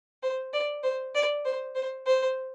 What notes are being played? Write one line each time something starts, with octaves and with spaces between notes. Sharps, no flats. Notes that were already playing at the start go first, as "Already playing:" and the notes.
C5
D5
C5
D5
C5
C5
C5